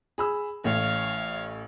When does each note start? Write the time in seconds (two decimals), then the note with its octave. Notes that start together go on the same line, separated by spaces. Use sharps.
0.18 G#4 B5 E6
0.64 A1 A2 C#5 F5